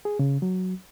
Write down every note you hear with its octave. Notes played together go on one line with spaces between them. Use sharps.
G#4
C#3
F#3